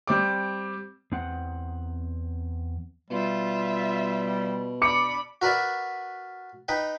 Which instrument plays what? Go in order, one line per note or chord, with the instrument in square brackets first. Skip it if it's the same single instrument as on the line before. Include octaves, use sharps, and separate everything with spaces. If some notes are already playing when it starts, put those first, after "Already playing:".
[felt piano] G3 C4 D6
[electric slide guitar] E2 C4 F#5
[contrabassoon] B2 [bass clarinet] G3 [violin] F4 E5
[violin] D4 B5 [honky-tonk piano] D6 C#7
[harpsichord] F#4 A#4 B4 D5 E5
D#4 B4 G5